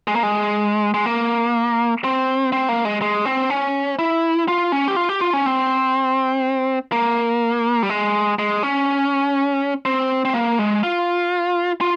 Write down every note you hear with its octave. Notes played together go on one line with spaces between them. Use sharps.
G#3
A#3
G#3
G#3
A#3
C4
C4
A#3
G#3
G#3
C4
C#4
E4
F4
C#4
G4
F4
G4
F4
C#4
C4
A#3
G3
G#3
G#3
C#4
C4
C4
A#3
G#3
F4
F4